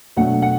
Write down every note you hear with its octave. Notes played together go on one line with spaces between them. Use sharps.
B2 F#3 A3 D4 F#5
F#5